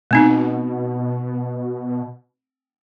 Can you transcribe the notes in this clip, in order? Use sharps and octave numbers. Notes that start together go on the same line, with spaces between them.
B2 A3 C4 D#4